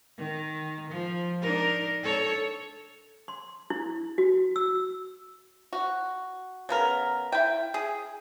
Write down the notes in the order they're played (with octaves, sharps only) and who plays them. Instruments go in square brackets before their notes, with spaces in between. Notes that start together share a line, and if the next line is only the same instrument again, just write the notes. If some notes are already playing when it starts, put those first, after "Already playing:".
[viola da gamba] D#3
F3
D4 D#4 A#4
A4 C#5
[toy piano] C6
E4
F#4
E6
[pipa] F#4
C#3 B3 A#4
E4 G5
G#4